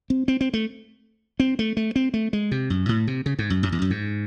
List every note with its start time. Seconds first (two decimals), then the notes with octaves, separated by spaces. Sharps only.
0.10 C4
0.28 C4
0.41 C4
0.53 A3
1.40 C4
1.59 A3
1.77 A3
1.96 C4
2.14 A3
2.33 G#3
2.51 C3
2.70 F#2
2.89 A2
3.07 C3
3.26 C#3
3.39 G#2
3.50 F#2
3.63 F#2
3.72 E2
3.82 F#2
3.90 G#2